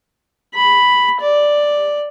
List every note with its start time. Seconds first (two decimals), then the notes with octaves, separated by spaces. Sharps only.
0.54 B5
1.21 D5